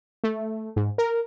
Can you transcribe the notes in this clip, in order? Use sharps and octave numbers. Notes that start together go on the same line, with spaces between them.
A3
G#2
A#4